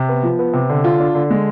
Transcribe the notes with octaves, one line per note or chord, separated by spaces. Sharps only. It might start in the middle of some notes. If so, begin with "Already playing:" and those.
Already playing: C3
B3
F3
B3
C3
D3
F4
D4
D3
G#3